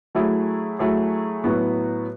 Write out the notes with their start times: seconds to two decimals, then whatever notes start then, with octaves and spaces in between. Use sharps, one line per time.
0.15 F#3 A3 E4 G#4
0.79 F#3 A3 E4 G#4
1.44 A2 F#3 B3 F#4